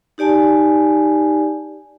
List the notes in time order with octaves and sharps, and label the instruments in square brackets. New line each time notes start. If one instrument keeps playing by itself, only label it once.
[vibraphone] D#4 G4 D5 G#5 A5